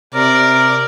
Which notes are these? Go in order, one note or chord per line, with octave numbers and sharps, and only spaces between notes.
C3 A#4 D5